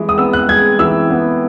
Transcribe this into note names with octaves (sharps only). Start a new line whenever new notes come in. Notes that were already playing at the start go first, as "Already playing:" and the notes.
Already playing: E3 G#3
D#6
B3 E6
F#6
G#3 G#6
E3 E6
B3